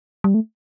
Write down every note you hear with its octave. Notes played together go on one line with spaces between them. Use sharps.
G3
A3